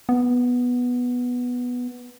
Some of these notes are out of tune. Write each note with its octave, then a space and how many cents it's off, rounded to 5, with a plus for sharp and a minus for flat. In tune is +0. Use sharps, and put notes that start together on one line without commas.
B3 -5